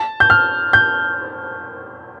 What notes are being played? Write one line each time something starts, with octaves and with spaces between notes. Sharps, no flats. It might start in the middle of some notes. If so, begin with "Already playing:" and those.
Already playing: A5
G6
F6
G6